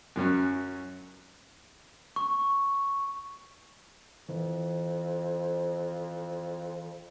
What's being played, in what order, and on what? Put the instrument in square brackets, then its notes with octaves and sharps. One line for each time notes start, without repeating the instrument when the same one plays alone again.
[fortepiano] F#2 F#3 C#4
[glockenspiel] C#6
[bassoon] F2 [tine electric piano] E3